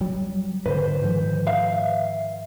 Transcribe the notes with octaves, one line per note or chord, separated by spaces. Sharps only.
F#3 G3
G#2 D3 B4 C5
G#2 D#3 F3
E5 F5